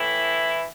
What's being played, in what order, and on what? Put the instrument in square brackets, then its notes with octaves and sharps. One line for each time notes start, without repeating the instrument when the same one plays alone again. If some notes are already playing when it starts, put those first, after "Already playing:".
Already playing: [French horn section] A2 E3 E4